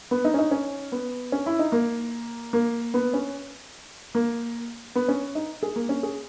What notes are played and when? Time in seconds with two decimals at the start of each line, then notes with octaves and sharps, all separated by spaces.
0.11 B3
0.25 D#4
0.34 C#4
0.39 D#4
0.51 C#4
0.92 B3
1.32 C#4
1.46 E4
1.59 D#4
1.72 A#3
2.53 A#3
2.94 B3
3.14 C#4
4.15 A#3
4.95 B3
5.08 C#4
5.35 D#4
5.63 G#4
5.76 A#3
5.89 C#4
6.03 G#4